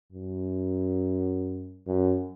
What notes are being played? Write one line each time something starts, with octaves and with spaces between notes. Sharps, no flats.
F#2
F#2